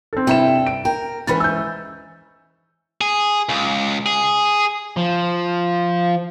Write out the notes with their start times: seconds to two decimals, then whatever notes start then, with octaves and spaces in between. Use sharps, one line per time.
0.13 C4 A4
0.27 G2 C3 E4 A4 G5 E7
0.66 D7
0.85 A#4 G5
1.27 G#2 E3 C#4 B4 B5 A6
1.40 E6 G6
3.01 G#4
3.49 C#2
4.06 G#4
4.97 F3